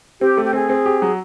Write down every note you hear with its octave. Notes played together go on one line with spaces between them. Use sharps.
C4 G4
A3
G4
C4 G#4
C4
G4
F#3